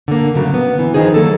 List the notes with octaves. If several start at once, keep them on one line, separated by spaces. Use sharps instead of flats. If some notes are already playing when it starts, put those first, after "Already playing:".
D3 A#3
A2 C#3 F#3
B3
E3
D#3 F3 D#4 G#4 C5
F#3 A#3 A4